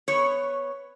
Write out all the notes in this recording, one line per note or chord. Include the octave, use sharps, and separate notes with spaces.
B3 C#5